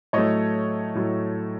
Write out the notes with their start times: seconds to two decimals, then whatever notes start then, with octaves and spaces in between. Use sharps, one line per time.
0.13 A2 F#3 A3 C#5 D#5
0.95 A2 F#3 A3